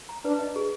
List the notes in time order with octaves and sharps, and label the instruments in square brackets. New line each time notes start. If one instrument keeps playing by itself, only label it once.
[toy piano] A#5
[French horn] D4 [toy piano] B4
[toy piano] D#5
G#4